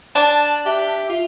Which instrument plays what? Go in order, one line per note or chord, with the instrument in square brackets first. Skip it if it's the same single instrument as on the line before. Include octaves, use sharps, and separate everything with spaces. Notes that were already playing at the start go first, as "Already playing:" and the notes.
[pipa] D4 [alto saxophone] A5
[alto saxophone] G4 [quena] E5
[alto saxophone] F4